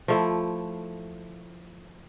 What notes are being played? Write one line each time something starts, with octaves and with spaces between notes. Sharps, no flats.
F3 A3 E4